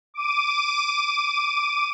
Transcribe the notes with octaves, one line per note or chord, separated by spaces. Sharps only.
D6 D#7